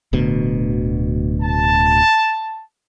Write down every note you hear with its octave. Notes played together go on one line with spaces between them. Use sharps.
D1 D2 B2
A5